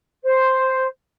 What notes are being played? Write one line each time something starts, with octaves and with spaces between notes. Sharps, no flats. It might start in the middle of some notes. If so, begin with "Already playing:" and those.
C5